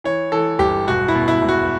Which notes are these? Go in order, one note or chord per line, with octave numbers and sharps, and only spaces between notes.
E3 C#5
E3 A4
G1 G4
E1 F#4
E4
B2
E4
E1
F#4